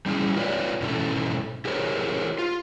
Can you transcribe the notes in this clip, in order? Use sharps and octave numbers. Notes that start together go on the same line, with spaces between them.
G3 C#4 E4 G#4
F4 B4 C#5 D5
G#2 B2 C#4 E4 A4
E4 G4 G#4 A#4 C5 C#5
F4